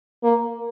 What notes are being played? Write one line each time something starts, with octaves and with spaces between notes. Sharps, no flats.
A#3